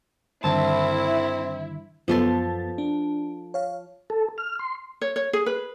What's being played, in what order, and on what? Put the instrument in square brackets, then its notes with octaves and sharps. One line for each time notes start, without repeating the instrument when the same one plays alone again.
[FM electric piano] G2 D3 D#3 [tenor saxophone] C4 [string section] E4 [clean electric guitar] A5
[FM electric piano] F#2 B3 A6 [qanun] F3 A4 C6
[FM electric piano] D4
C#5 F5
[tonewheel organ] A4
F6
C6
[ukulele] C#5
C#5
G#4
B4